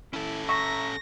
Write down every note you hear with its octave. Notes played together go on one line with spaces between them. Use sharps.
C#4 E4 A4
E5 A#5 C#6 A#6